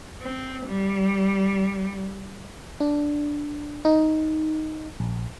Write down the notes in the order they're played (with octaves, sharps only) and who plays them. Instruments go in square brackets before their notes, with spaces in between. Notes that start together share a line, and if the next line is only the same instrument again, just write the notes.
[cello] C4
G3
[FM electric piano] D4
D#4
A#1